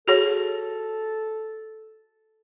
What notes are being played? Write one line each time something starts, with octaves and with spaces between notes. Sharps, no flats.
F#4 G#4 A4 C#5